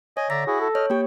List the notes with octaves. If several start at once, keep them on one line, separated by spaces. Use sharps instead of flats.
C#5 D#5 G#5
D3 D5 E5 A#5 A#6
E4 F#4 G#4
A4
C#5 D#5 F6
A#3 G4 G5